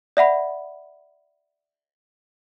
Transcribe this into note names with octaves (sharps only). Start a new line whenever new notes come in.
D5 E5 F#5 B5